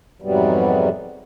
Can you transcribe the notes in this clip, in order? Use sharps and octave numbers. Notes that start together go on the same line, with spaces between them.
F2 G#2 C3 F#3 G3 B3